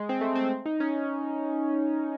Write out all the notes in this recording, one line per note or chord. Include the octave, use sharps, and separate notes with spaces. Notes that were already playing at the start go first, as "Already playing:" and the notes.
Already playing: G#3
C4
A3
C4
D#4
C#4